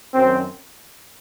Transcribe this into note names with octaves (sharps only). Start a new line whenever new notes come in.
F#2 D#3 F#3 C4